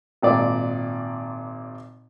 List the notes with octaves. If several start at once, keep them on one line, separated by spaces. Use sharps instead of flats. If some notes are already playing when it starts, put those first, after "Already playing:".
G#1 A#2 D5